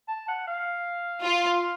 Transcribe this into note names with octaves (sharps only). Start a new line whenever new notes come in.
A5
F#5
F5
F4